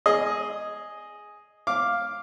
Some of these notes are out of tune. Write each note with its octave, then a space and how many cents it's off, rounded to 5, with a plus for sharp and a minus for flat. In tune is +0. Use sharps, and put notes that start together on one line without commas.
G#4 +0 D#5 +0
F5 +0 D6 +0